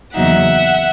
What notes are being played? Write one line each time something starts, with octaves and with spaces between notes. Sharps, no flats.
E2 C#3 F#3 A#3 D#4 E5 F#5